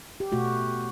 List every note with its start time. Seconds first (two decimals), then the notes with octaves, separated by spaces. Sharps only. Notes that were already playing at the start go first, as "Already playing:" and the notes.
0.20 G4
0.32 B2 A3 F#4